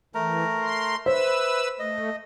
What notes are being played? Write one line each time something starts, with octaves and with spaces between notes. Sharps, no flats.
E3 A3 A#4 A#5
C6
B4 C5 E5 E6
A3 D#5